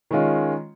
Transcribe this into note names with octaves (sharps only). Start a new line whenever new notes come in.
D#3 G#3 C#4 F4